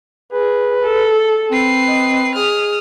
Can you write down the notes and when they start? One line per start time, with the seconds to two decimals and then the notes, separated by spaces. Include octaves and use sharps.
0.33 G#4 B4
0.83 A4
1.51 C4 B4 C7
1.89 D#5
2.35 G#4 D#6 F6